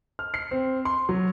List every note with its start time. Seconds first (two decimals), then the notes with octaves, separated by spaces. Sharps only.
0.19 F6
0.34 C7
0.51 C4
0.85 C6
1.09 F#3